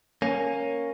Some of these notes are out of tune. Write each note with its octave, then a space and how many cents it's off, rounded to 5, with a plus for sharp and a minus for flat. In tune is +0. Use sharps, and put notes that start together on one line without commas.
A#3 +0 C#4 +0